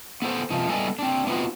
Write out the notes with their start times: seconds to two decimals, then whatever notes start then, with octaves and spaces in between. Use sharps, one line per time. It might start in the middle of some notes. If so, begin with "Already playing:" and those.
0.22 B3 A4 C5
0.50 C3 F3 D#4
0.69 G3 A3 B3 A4 D#5 G#5
0.99 C4 D4
1.27 B3 C4 D#4 F4 F#4